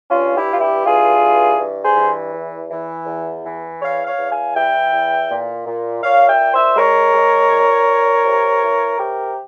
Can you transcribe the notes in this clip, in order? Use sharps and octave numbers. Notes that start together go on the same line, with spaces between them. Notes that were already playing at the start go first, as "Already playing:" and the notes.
G2 C#4 F4
E4 G4
E3 F4
E4 G4
G2 F4 G#4
E3
G2
G#4 C5
E3
E2
E3
E2
E3
E2 C#5 F5
C#5 F5
E2
F5 G#5
E3 E5 G5
E2
A#2
A#2
A#2 C#5 F5
E5 G5
A#2
C5 E5
G#3 A#4 C#5
G#3
A#2
A#2
C3
E3
C3 G4 A#4